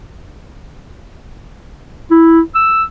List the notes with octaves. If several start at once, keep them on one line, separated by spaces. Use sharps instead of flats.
E4
E6